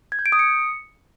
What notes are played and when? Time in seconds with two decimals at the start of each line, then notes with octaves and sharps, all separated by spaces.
0.12 G#6
0.19 G6
0.26 D7
0.32 D#6
0.39 C#7